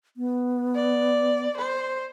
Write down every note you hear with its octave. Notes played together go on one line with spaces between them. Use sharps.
B3
D5
C5